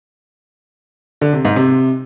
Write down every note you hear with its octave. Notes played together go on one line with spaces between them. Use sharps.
D3
C3
G#2
C3